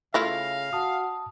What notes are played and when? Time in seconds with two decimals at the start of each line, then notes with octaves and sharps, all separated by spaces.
0.14 C#3 A3 E4 F4 F5 A#6
0.73 F#4 A5 D#6